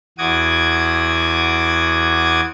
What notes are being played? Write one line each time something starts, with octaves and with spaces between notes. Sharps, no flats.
E2 F#4 D6 D#6 G#6